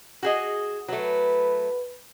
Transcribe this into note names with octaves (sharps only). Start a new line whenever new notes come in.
F#4 G#4 D#5
F#3 A3 B4